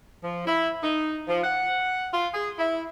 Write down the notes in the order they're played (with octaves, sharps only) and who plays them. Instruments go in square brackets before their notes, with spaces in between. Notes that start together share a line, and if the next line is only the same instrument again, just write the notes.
[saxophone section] F3
E4
D#4
F3
F#5
F4
G#4
E4